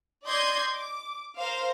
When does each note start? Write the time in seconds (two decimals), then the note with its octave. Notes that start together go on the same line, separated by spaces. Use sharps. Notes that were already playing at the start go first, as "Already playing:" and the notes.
0.25 D5 D#5 C6 G6 G#6 C7
0.71 D6
1.37 A#4 C5 F5